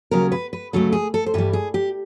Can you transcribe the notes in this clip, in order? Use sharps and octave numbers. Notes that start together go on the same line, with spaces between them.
D#2 C#3 F#3 A#4
B4
B4
D2 C#3 F#3 A3 A4
G#4
A4
C5
G2 E3 G3 B4
G#4
G4